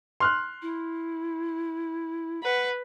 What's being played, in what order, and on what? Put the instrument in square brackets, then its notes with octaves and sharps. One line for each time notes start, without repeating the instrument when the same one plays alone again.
[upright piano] C6 F6 F#6
[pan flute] E4
[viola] B4 [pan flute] F#5